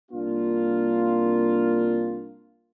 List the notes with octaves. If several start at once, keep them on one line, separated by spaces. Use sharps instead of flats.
C2 A#3 D4 F4